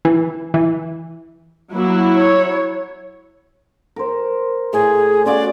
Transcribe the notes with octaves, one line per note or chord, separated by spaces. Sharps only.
E3
E3
F#3 A#3 E4 F#4
C#5
A#4 C5
A2 G#4
C#4 F4 F#4 D5